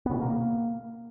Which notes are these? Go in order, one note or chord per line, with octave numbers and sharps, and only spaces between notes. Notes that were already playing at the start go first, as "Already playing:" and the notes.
B3
C#3
B2
A#3